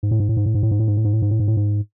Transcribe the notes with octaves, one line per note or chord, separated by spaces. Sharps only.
G#2
A2
G#2
A2
G#2
A2
G#2
A2
G#2
A2
G#2
A2
G#2
A2
G#2
A2
G#2
A2
G#2